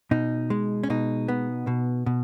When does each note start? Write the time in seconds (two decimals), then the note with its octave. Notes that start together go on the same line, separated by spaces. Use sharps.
0.11 B2 D#4
0.50 G#3
0.83 C#4
0.90 B2 D#4
1.28 B3
1.67 B2
2.06 B2